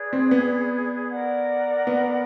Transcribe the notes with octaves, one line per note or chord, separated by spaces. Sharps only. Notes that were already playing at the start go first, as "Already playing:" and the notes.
Already playing: G#4 B4 D5
C4
B3
A#4 D5 F#5
B3